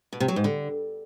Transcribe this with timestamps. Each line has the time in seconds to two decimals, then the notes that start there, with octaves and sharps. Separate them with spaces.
0.13 B2
0.20 C3
0.28 F#3
0.36 G#2
0.44 D3